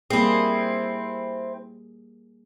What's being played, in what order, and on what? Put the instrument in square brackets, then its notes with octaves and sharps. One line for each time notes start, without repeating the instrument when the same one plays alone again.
[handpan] G3 A#3 G#4 [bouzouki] C4 E4